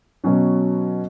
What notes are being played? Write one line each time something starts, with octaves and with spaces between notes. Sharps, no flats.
B2 F#3 C#4